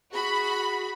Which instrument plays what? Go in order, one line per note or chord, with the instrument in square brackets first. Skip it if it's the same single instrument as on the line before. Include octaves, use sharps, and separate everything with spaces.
[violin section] F#4 B5 [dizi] G#4